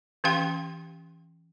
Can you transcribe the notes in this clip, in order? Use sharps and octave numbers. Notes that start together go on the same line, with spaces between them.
E3 C#4 G4 F5 G5 C6